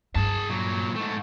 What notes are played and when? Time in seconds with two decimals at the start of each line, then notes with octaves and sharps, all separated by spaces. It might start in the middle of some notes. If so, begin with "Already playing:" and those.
0.15 G2 G#4 A5
0.49 A#2 F#3
0.96 G#2 A3